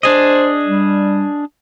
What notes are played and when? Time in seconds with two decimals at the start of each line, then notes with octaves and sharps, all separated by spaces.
0.03 D4 G#4 C5 D#5
0.65 G3